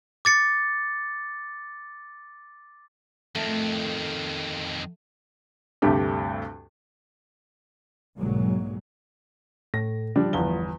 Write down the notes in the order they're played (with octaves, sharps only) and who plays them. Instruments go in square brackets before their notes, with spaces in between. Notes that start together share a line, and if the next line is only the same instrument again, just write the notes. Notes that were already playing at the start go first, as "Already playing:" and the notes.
[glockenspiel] D6 A6 C#7
[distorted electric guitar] F2 D#3 [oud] A3
[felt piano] D2 G2 C3 A3 G4
[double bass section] B1 G#2 D3 F#3 G#3 A#3
[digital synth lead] A2 [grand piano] A#6
[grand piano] F3 G3 D4
[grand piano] G1 E2 G7 [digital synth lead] F3